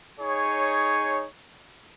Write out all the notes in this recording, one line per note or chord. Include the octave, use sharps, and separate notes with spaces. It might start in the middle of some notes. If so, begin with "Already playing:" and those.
D#4 G#4 C#5